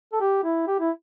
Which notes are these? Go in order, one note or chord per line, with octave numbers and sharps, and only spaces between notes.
A4
G4
E4
G4
E4